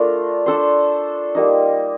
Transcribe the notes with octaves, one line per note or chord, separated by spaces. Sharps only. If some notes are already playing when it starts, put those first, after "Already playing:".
Already playing: A3 D4 F4 A#4
D4 A4 C5
G3 A#3 D#4